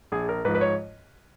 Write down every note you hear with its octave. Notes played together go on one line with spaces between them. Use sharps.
A#1 G#4
A#4
G#2 F3 B4
B4
C#5